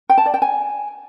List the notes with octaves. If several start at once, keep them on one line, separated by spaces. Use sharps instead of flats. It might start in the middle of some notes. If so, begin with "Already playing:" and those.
G5
A5
D5
G5
G#5